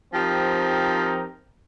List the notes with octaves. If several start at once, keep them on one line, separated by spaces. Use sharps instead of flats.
F3 C4 D#4 G4 A#4